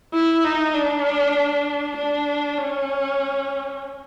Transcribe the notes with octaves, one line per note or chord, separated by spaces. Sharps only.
E4
D#4
D4
D4
C#4